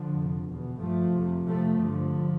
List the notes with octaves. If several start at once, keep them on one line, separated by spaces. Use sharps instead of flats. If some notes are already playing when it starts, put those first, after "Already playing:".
Already playing: D3 F3
F2 C3
E2 B2
G2 F3 A3
F2 C3
F2 C3 F3 A3
G2 D3 F3